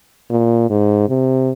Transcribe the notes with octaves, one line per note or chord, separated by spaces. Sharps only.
A#2
G#2
C3